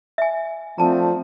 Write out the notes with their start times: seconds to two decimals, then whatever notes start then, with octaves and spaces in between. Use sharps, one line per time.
0.18 E5 G#5
0.78 D3 F3 A3 C4 A5 A#5